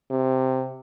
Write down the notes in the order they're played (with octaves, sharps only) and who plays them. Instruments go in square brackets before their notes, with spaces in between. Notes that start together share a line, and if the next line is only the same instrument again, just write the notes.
[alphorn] C3